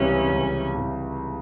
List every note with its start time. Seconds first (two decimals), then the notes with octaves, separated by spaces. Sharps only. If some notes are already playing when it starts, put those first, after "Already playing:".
Already playing: C#2 C3 E3 G3 C#4
0.30 C#2
0.75 C3 E3 G3